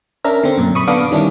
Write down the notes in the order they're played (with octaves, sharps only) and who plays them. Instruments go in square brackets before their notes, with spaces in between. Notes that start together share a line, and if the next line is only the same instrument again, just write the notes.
[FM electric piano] C#4 D4 A#4 E5 A#5
D3 C4
F#2 A#2
B5 C#6 D#6
D3 B3 D4 F5 D6 D#6
D#3 G3 C#4 D4 E4